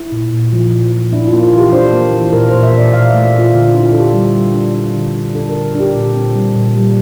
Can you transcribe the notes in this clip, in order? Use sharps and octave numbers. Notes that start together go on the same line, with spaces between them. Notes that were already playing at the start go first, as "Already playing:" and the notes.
Already playing: E4
A#2
A#2
F3
A#2
F3
D4 E4
F4
A#3
F4
E3 G4
D4 C5
A#3
E3
A#2 A#4
C5
A#2
E5
A#2 D5
A#2 F5
D5
E5
A3
D5
A#2
F4
D3 F4
D4 E4
F4
D4 A4
G4
G3
G3
D4
D4
D3
D4
D4 A4
D3 A#4
D4 G4
A#2
C4
G3
A#2
G3